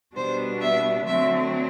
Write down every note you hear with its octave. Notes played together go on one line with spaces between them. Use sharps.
B2 G3 B3 D4 C5
E5
D3 F#3 A3 C4 E5